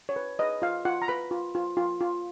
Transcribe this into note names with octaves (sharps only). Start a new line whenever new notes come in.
C#5
B4
B4 D#5
F4 F5
F4 F#5
A#5
B4 B5
F4
F4
F4
F4